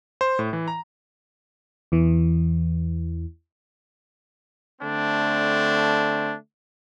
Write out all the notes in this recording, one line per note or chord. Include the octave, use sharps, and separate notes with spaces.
C5
A2
E3
A#5
E2 E3
D3 A3 C4 D4